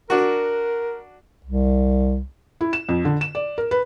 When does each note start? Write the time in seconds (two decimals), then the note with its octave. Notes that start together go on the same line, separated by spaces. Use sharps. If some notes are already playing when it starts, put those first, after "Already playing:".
0.10 D4 F#4 A#4
1.45 C2
2.61 E4
2.73 E7
2.89 F2
3.05 D3
3.21 E7
3.35 D5
3.58 A#4
3.71 B4